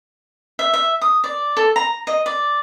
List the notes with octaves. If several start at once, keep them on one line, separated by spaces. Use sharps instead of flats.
E5
E5
D#6
D5
A4
A#5
D#5
D5